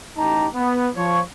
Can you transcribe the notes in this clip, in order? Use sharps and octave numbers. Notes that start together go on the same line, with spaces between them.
A1 D#4 G4 A5 A#5
B3
F3 C#5